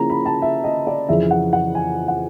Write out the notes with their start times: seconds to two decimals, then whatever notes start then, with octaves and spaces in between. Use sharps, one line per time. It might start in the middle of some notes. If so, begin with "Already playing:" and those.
Already playing: C#3 F3 A#3 C#4 E4 A#5
0.10 B5
0.26 A5
0.42 E5
0.64 D#5
0.87 D5
1.08 F2 C#3 E3 E5
1.31 F#5
1.53 F#5
1.75 G#5
2.08 F#5